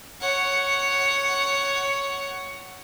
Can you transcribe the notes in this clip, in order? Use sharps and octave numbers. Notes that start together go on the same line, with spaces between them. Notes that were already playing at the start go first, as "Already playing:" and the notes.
C#5 F#5